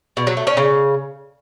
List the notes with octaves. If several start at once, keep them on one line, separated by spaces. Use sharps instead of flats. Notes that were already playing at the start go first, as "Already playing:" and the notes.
B2
F#3
A3
C#4
C#3